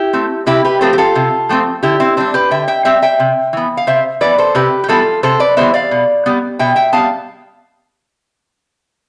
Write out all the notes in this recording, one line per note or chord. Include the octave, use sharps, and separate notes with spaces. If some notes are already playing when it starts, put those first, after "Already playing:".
Already playing: E4 G4
A3 C4
C3 E4 G4
G4 B4
F3 A3 C4 A4 C5
G4
F4 A4
C3
F3 A3 C4
D3 E4 G4
C4 E4
G3 C4 D4
G4 B4
D3 E5 G5
E5 G5
G3 C4 E5 G5
E5 G5
C3
E3 B3
F5
C3 C5 E5
E3 B3 B4 D5
A4 C5
C3 G4 B4
G4
E3 G3 B3 F4 A4
C3 A4 C5
B4 D5
E3 G3 B3 C5 E5
D5 F5
B2
G3 B3
B2 E5 G5
E5 G5
G3 B3 F5 A5